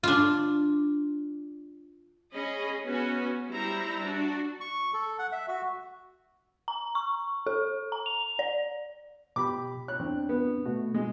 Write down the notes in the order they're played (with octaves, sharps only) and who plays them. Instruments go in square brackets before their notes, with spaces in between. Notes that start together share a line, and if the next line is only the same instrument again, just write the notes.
[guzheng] D4 F4
[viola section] C#4 G#4 D#5 B5
B3 C#4 F#4
G3 E4 C5 E5 A#5
D4 F#4
[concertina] C#6
A4
F#5
E5
F#4
[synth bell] A#5
C#6
A4
A#5
F7
D5
[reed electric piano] B2 G4 B5 [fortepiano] D6
[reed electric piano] C#5 [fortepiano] F#6
[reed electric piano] E2 C4 D4
[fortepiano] B3
[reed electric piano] B2 A3 F#4
[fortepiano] G#3